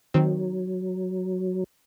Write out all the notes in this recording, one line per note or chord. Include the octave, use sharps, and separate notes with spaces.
D#3 F#3 C4